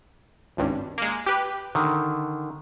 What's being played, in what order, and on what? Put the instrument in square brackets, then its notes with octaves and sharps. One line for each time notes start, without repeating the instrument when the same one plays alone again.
[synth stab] G#1 C#2 G2
G#3 A#3
G4 B4
[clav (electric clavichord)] D3 D#3